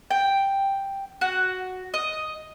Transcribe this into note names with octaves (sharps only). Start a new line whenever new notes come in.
G5
F#4
D#5